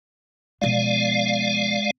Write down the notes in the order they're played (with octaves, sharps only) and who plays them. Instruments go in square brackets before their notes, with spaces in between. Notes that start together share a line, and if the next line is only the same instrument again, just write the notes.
[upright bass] B2 F3 [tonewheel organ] G#3 D5 F5